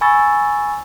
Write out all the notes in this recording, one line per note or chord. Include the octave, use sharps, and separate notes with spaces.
G#5 B5 C#6 E6 A6